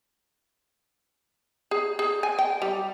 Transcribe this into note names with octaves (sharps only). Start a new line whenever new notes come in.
G#4
G#4
G#5
G5
G3